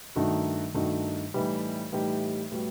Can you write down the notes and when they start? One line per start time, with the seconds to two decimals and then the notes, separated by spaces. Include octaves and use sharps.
0.16 G2 D#3 A3 D#4 F#4
0.74 G2 D#3 A3 D#4 F#4
1.34 A2 E3 G3 D#4 G4
1.92 A2 E3 G3 D#4 G4
2.52 A2 G3 B3 F#4